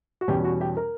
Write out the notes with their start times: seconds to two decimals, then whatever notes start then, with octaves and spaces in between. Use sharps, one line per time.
0.21 F#4
0.28 E2 B2 G3 C#4 G4
0.44 F#4
0.61 G4
0.77 A#4